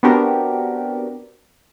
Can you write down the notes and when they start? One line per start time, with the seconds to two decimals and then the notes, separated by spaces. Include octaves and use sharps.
0.03 B3 C4 D4 F#4 G4 A#4